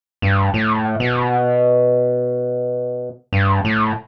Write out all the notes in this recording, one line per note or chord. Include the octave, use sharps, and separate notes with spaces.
G2
A2
B2
G2
A2